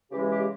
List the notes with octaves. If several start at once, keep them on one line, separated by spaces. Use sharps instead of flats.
C#3 E3 G#3 G4
G4